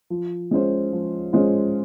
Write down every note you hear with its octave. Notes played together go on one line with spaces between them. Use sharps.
F3
G#3 C#4 F4 C5
F3
G#3 C#4 F4 C5